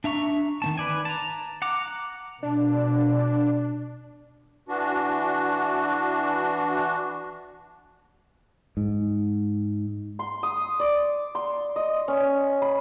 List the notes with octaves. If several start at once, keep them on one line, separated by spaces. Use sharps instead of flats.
D4 E5 A#5 C#6
D#3 C4 A5
B4 D5 G#5
A5 A#5
F#5 A#5 D6
B2 D4
E3 D4 F#4
G#2
C6
D#6
D5
C6
D#5
C#4
B5